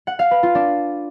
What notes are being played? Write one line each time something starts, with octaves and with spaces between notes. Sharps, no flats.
F#5
F5
B4
F4
D4